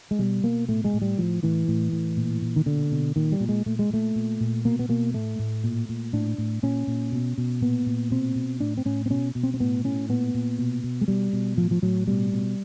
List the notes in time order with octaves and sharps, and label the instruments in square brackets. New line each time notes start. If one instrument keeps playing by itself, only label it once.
[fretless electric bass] G#3
B2 G3
B2 A#3
A2 A3
G#3
A2
G3
A2 F3
A2 E3
A2
A2
A#2
A#2
D#3
B2 D3
B2
A#2 D#3
G3
A#2
G#3
A#2 A3
G#3
A#2 A3
A#2
A#2
B2 A#3
B3
B2 A#3
A2 A3
A2
A#2
A#2
A2 D4
A2
A#2 C#4
A#2
B2
B2
A#2 B3
A#2
B2 C4
B2
A2 D4
C4
A2 C#4
C4
B2 C#4
B2
C4
C4
A2 B3
A2 C#4
A#2 B3
A#2
B2
B2
G#3
B2 G3
B2
A2 F3
F3
A2 F#3
B2 G3
B2